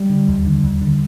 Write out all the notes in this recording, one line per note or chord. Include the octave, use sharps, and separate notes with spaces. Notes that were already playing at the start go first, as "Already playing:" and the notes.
Already playing: G3
D3
D#2
D3
D#2
D3